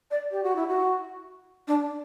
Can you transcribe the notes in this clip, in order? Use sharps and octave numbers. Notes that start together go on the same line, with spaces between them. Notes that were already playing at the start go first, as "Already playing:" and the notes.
D5
G4
F#4
E4
F#4
D4